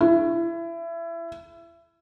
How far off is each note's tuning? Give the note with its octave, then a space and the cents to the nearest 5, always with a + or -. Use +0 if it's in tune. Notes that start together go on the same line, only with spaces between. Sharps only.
E4 +25